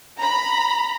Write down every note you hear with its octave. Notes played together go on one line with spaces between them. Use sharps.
A#5 B5